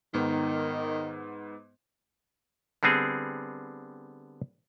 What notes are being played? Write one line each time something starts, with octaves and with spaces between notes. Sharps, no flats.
G#2 D#3 B3
D3 G3 B3 C4 G#4